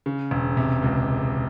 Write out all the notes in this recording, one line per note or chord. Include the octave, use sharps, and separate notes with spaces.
C#3
E1
C3
C#2